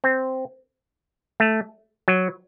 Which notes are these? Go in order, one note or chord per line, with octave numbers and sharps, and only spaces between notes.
C4
A3
F#3